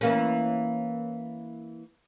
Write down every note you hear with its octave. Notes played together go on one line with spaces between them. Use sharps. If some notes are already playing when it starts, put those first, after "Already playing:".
E3 A#3 C#4